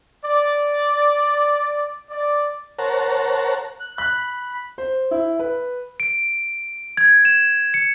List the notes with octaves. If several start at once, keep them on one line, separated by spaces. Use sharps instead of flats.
D5
D5
A#4 C5 C#5 F#5 A5 A#5
F#6
B5 F#6
C5
E4
B4
D7
G#6
E7
C#7